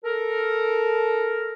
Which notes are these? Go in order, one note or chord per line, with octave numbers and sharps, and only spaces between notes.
A4 A#4